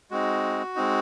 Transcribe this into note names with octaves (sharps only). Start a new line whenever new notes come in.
G#3 C4 D#4 F#4
G#3 C4 D#4